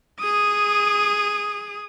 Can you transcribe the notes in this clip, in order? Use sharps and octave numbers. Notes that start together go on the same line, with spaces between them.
G#4 D#6